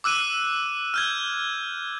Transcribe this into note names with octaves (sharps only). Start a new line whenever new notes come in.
D6 E6 F#6 D#7
F6 G6 G#6